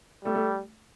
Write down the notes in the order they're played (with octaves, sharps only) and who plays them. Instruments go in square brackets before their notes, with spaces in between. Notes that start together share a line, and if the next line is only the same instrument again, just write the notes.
[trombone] G3 [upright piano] A3
[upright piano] A3